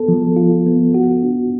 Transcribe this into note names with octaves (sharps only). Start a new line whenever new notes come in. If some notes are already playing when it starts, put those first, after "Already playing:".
Already playing: B3 A4
F3
F4
B3
F#4
D4